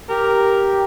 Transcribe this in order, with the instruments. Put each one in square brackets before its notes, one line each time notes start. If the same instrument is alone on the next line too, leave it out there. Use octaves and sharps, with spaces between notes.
[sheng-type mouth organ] G4 [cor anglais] A#4